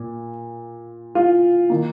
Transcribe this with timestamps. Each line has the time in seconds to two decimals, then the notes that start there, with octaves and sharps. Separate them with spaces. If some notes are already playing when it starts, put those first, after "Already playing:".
Already playing: A#2
1.15 F4
1.70 D#3 A#3